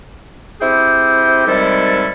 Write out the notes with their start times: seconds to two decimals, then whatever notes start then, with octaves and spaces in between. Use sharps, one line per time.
0.61 C4 E4 G4 G#4 G5
1.47 C3 D#3 G3 G#3 E4 A4